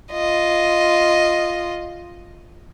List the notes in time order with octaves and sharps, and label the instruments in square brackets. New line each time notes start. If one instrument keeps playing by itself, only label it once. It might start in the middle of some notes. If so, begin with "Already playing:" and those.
[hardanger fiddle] F4 D#5